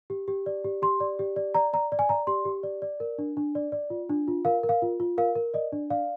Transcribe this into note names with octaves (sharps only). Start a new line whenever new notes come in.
G4
G4
D5
G4
G4 C6
D5
G4
D5
D5 A#5
D5 A#5
D5
G#5
D5 A#5
G4 C6
G4
D5
D5
A#4
D4
D4
D5
D5
F4
D4
F4
A#4 F5
A#4
F5
F4
F4
A#4 F5
A#4
D5 D#5
D4
D5 F5